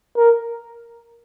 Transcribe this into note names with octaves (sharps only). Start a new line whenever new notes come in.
A#4